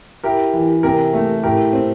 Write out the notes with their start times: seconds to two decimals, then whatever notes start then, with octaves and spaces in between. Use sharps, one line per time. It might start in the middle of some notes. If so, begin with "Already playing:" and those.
0.23 E4 G4 A#4
0.53 E3
0.83 C3 G4 A#4
1.13 A3
1.43 A2 G4 A#4
1.73 C4